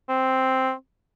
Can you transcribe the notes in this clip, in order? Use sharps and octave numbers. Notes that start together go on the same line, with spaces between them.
C4